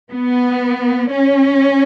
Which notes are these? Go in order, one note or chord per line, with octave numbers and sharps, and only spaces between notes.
B3
C#4